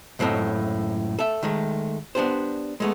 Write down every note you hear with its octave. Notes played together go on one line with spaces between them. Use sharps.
C#2 F#2 A2 C4 A4 D#5
A4 E5
D#3 G#3 A3
B3 D4 G4 C5
G#3 A3 B3